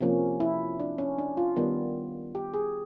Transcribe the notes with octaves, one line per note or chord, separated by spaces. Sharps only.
C3 F3 A#3 C#4
E4
D4
C#4
D4
F4
D#3 G3 B3
G4
G#4